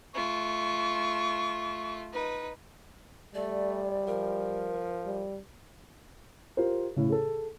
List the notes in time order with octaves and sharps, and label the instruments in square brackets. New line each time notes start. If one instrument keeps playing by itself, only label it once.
[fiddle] A3 F4 [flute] C#6
[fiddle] D#4 B4
[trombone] G3 [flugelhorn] A3 [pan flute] D5
[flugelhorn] F3 [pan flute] A#4
[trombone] G3
[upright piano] F4 G4 A#4 C5
A2 C#3
G#4 A4